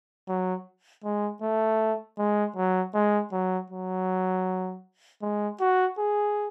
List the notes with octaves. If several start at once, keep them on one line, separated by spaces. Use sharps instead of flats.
F#3
G#3
A3
G#3
F#3
G#3
F#3
F#3
G#3
F#4
G#4